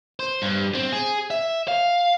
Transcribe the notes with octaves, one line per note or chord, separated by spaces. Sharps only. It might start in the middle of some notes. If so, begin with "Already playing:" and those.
C5
G2
C4
G#4
E5
F5